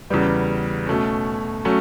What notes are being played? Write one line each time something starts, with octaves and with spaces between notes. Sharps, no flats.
E2 C#3 G3 B3
B2 A3 C#4
F#3 A3 C#4